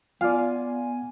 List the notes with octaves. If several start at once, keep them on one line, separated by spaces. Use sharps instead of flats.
B3 F4 D5 F5 G#5